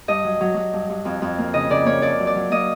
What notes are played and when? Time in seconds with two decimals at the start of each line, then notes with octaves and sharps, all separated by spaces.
0.08 G2 D#5
0.24 F#3
0.41 F#3
0.57 F#3
0.73 G2
0.90 G2
1.05 F2
1.22 F2
1.38 A#3
1.54 C#3 D#5
1.70 C#3 D5
1.86 A#3 C#5
2.02 F2 D5
2.19 F#3
2.27 D5
2.35 F#3
2.51 A#3 D#5